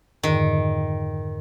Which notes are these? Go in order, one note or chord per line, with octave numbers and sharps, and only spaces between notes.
F2 G#2 D3 D#3